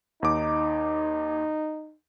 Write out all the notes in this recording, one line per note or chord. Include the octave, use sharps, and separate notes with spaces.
D#2 D#4 D6